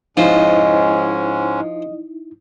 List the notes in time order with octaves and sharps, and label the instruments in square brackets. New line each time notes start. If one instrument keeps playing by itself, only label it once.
[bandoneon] G#2 G#3 C#4 [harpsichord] F3 [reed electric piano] D#4 E4 [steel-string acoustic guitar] D#5